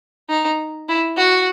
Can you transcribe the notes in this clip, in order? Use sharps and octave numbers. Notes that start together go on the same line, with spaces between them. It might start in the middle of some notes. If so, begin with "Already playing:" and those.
D#4
E4
F#4